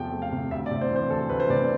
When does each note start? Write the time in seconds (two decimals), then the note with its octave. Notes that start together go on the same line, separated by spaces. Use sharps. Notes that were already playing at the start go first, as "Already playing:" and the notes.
Already playing: E2 C3 F3 A3 G5
0.12 A3
0.22 F5
0.32 C3
0.51 D2 E5
0.66 D5
0.71 C3
0.81 C5
0.91 E3
0.96 C5
1.10 D2 A4
1.29 D2 B4
1.40 C5
1.50 C3 D5